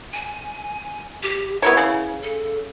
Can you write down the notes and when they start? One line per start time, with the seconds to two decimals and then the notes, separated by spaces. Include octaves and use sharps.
0.13 G#5
1.23 G4
1.62 B3 E4 A#4 C#5
1.77 C#3 E4
2.23 A4